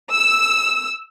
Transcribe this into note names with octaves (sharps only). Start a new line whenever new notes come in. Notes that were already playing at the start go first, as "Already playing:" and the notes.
E6